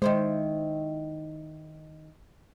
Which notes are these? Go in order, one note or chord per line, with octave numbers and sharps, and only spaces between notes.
D#3 G#3 E4 C5